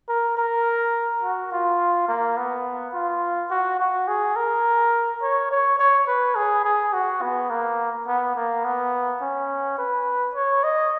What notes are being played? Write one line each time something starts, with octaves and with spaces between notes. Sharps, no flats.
A#4
A#4
F#4
F4
A#3
B3
F4
F#4
F#4
G#4
A#4
C#5
C#5
C#5
B4
G#4
G#4
F#4
B3
A#3
B3
A#3
B3
C#4
B4
C#5
D#5